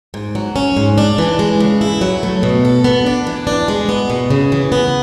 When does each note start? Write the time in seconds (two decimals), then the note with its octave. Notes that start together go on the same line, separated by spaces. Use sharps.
0.14 G#2
0.35 F#3
0.56 C#4
0.77 G#2
0.98 D4
1.18 E3
1.39 G#3
1.60 C#3
1.81 E4
2.01 F#3
2.23 A3
2.43 B2
2.65 A4
2.84 B3
3.06 D4
3.27 E3
3.47 D4
3.68 G#3
3.89 B3
4.10 B2
4.30 C#3
4.52 E3
4.72 B3